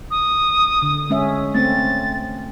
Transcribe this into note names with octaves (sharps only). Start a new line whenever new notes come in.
D#6
D3
G#3 C#4 E5
A3 C4 C#4 A6